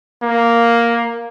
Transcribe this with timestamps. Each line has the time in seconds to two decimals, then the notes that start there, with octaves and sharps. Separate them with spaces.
0.23 A#3